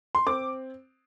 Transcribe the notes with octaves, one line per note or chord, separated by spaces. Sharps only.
C6
C4 D6